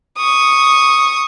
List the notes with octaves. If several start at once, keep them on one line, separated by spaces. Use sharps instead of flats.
C#6 D#6